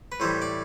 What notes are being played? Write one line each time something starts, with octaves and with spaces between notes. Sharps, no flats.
B4
A2 E3 G3 C5
D5